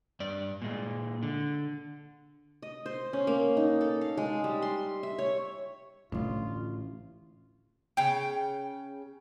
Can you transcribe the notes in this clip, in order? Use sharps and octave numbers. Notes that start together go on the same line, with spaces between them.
G2 D5
A#2 G#3
D3
D#5
C5
C#4
A#3
D#4
A4
F5
G#3
G3
C6
E5
C#5
A1 D3 A3 F4
C#3 G5